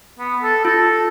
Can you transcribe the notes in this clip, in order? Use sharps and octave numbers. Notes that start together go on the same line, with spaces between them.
B3
A4
F4 A4